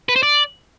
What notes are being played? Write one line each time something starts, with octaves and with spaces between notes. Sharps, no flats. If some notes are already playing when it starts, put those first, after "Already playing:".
B4
C5
D5